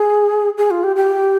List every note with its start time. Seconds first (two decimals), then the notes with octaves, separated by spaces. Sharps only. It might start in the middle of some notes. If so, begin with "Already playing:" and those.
Already playing: G#4
0.58 G#4
0.71 F4
0.84 G4
0.96 G4